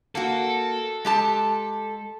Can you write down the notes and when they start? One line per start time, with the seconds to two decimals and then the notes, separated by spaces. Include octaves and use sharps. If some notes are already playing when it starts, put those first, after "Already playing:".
0.15 A#3 F#4 A4
1.05 G#3 G4 A5